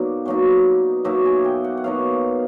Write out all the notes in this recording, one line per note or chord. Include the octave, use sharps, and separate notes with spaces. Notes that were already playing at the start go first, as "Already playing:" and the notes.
Already playing: B2 F#3 A#3 D#4 D5
B2 F#3 A#3 D#4
B2 F#3 A#3 D#4 E5
G#5
G5
F#5
F#5
B2 F#3 A#3 D#4 F5